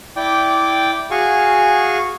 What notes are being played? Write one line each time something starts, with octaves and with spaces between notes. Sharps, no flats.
E4 D5 G5 D6
F#4 G#4 F5 G#5 C#6